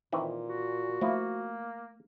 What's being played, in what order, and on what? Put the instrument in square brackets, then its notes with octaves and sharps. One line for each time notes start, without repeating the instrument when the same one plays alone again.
[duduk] A#2 [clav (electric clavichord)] D#3 E3 C4
[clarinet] F#4
[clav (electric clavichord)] F3 E4 [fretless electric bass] A3 [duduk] A#3